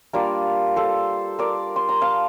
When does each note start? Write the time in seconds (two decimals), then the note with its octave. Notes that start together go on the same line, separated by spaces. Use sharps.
0.13 G3 A#3 D4 F4 A#4 D5
0.76 A4 C5
1.39 A#4 D5
1.76 C6
1.89 A#5
2.02 F5 A5